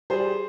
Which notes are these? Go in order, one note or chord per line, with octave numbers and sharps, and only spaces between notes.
G3 G#4 C5